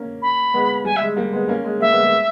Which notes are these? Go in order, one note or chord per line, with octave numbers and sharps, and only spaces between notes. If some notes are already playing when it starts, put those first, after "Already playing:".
Already playing: A#3 C#4
B5
G#3 B3
G3 G#5
E5
G#3
G3 A#3
G#3 B3
A#3 C#4
G#3
G3 A#3 E5
G#3 B3
G#3